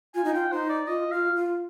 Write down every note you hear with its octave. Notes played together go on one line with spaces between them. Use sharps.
F4 G#5
D#4
F4 G5
D#4 C5
D5
F4 D#5
F4 F5
F4